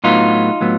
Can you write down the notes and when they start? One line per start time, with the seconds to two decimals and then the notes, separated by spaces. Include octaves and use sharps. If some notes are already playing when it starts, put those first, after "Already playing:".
0.04 A2 F#3 B3 D#4 F4
0.61 A2 F#3 B3